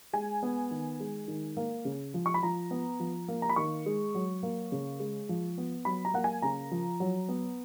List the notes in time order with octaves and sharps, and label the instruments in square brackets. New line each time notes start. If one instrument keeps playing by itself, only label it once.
[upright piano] G#3 G#5
B3
D#3
G#3
D#3
A#3
C#3
F3
C#6
B5
F3 A#5
B3
F3
A#3
A#5
B5
D#3 C#6
G#3
F#3
A#3
C#3
G#3
F3
B3
F#3 B5
A#5
A#3 F#5
G#5
C#3 A#5
F3
F#3
B3